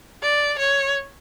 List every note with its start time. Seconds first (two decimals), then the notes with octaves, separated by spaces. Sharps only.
0.22 D5
0.59 C#5